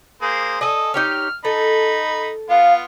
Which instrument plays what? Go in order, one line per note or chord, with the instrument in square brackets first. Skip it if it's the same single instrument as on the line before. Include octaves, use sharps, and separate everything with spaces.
[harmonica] A#3 G#4 C5
[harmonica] A4 D#6 [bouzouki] D#5 G#5
[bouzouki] D#4 G4 C#5 [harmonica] F6
[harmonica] D#4 B5 [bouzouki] A4
[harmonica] B3 F4 [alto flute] F5